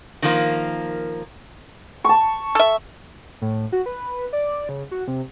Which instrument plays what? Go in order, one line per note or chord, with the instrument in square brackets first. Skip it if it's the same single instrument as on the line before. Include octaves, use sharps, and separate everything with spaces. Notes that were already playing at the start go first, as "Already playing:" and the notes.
[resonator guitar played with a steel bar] D#3 F3 A#3
[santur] A5 C#6
[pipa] A4 E5
[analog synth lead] A2
F#4
B4
D5
C#3
F#4
C3